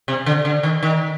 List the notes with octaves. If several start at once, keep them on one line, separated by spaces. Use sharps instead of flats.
C3
D3
D3
D#3
D#3